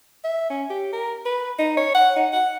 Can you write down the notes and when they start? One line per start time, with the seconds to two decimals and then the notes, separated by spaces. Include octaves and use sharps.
0.24 E5
0.50 C#4
0.70 G4
0.93 A#4
1.26 B4
1.59 D#4
1.77 C#5
1.95 F#5
2.16 D#4
2.32 F#5